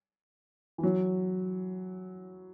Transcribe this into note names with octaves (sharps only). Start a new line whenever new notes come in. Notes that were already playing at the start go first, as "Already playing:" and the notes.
E3
F#3